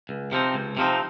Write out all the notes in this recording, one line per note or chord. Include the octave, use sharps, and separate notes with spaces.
C#2
C3 F3 C4 D#4
C#2
C3 F3 C4 D#4